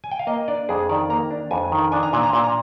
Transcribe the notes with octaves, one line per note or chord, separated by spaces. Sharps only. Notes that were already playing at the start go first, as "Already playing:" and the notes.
G#5
G5
F5
A#3 D#5
D4 D5
F2 G#4
D#3 D5
A#3 A#5
D4
F2 G#5
D#3
D4 G#5
A#5
A#2 G#5
A#5
A#2 G#5
A#5